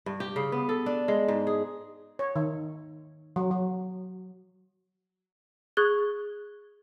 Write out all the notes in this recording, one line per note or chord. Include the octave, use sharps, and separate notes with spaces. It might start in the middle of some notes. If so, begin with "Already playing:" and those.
G2
G4
C#3
B3
A4
D4
G#3
G#2
G#4
C#5
D#3
F#3
F#3
G#4 C#6 F#6 G#6 A6 G7